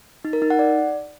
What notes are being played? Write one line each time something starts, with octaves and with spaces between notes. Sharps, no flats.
D#4
A#4
D#4
F#5
D5